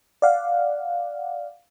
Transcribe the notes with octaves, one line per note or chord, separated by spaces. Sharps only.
D5 F5 F#5